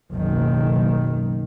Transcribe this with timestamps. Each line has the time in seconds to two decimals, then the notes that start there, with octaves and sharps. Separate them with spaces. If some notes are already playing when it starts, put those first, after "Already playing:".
0.11 F#1 B1 D#3